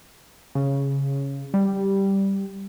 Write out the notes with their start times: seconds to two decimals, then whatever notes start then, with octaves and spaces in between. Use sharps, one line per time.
0.55 C#3
1.54 G3